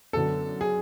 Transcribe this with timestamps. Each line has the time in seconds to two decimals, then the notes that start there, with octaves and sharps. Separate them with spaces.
0.13 F#2 D3 F#3 B3 A4
0.61 G#4